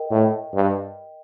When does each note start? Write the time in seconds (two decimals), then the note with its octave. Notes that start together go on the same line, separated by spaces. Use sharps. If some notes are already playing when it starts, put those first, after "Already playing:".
Already playing: A#4 D#5 G5
0.11 A2
0.54 G2